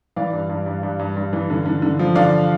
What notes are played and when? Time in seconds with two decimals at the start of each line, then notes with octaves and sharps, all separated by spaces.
0.16 E3 D5 F5
0.33 G2
0.50 G2
0.66 G2
0.83 G2
0.99 G2
1.17 G2
1.33 E3
1.50 D3
1.66 D3
1.82 D3
1.99 F3
2.15 D3 D5 F5